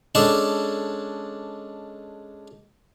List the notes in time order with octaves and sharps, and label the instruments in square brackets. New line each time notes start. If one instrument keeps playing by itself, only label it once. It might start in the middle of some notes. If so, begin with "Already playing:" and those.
[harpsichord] G#3 C#4 D4 A4 A5